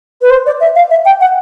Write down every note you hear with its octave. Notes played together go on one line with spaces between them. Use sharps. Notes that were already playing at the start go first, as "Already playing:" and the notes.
B4
C5
D5
E5
F5
E5
G5
F#5